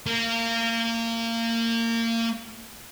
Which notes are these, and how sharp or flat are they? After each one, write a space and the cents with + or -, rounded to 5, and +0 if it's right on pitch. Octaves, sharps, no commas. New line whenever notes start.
A#3 -25